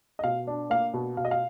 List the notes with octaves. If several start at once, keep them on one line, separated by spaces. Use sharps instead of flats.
D#5
B2 F5
D4
A#3 F5
B2
B2 F5
D#5
F5